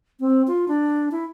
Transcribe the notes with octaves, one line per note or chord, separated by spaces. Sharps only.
C4
F4
D4
E4